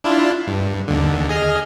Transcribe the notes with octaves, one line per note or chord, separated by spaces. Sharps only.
D4 E4 F4
G2
D#2 D3
G#4 D#5 F6